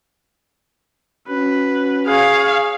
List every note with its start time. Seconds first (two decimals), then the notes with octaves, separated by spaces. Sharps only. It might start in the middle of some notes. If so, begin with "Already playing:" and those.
1.28 C#4 F#4 B4
2.07 G#4 C#5 F5